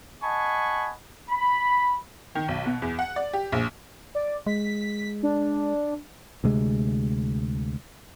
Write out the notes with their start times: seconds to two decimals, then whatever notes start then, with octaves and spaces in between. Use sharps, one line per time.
0.23 D#5 F#5 G#5 A5 B5 C#6
1.30 B5
2.35 D#3
2.48 B1
2.66 B2
2.82 E2
2.99 F#5
3.16 D5
3.33 G4
3.52 A#1
4.15 D5
4.47 G#3 B6
5.23 D4
6.44 D2 C3 G#3